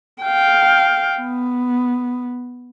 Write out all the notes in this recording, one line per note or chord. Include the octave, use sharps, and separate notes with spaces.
F5 G5
B3